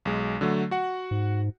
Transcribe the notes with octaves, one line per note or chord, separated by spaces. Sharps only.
B1 G#3
D3 F#3 A3
F#4 F#5
G#2